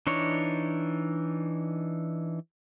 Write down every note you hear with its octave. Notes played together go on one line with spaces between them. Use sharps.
E3 D4 D#4 C#5